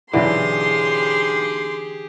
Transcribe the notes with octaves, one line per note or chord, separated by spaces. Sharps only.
B1 D3 E3 G4 G#4 B4 C6